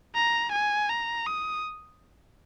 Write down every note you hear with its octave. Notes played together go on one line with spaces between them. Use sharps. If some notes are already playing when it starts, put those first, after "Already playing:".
A#5
G#5
A#5
D#6